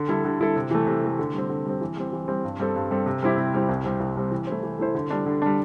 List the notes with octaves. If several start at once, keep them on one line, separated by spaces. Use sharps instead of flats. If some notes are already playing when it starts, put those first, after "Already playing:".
Already playing: D3
G3 E4 A4
D3
G3 E4 A4
C3
E3 A3
C3
E3 A3
D3
G3 C4
D3
G3 C4
E3
G3 C4
E3
G3 C4
G2
G3 C4 A4
G2
G3 C4 A4
C3
G3 C4 E4 G4
C3
G3 C4 E4 G4
C2
C3 G3 C4
C2
C3 G3 C4
E3
A3 E4 C5
E3
A3 E4 C5
D3
G3 D4
D3
G3 D4